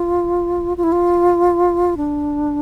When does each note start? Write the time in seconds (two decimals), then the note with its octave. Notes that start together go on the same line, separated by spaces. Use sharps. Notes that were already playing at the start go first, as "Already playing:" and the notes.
Already playing: F4
0.77 F4
0.83 E4
0.92 F4
1.97 D4